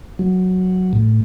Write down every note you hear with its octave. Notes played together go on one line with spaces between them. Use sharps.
F#3
A2